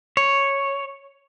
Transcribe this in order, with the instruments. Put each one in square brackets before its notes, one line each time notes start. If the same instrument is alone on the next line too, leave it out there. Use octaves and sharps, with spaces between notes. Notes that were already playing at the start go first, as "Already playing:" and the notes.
[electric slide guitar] C#5